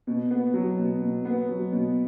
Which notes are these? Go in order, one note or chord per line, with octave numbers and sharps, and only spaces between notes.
B2
B3
F#3
B2
B2
B3
F#3
B2